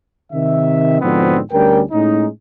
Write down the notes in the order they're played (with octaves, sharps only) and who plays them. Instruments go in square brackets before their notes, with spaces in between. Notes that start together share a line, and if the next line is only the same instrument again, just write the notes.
[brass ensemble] C3 D#3 E5
G#2 B2 D3 F3 B3 C4
D2 G3 C#4 A#4 G5
A2 G#3 C#4 D#4